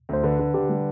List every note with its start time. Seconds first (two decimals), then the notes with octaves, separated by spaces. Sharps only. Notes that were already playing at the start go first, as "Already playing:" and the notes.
0.09 D2 C5
0.23 D3 B4
0.39 D3
0.54 D3 G4
0.69 G3